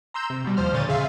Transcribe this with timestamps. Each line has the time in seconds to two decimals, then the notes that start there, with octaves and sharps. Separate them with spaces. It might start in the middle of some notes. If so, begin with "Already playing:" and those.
0.14 A#5 C6 E6 G6
0.30 C3
0.44 B2 G3
0.57 D#2 F3 C5 F6
0.73 A#2 D3 C#5 G6 A6 D#7
0.87 F2 C#3 G#4 E5 F5 C6